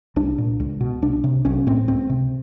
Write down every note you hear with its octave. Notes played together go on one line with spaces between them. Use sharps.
C2 D4
A#2
C#2
B2
C2 D4
C3
B1 C#4
A2 C4
C#2 C4
C3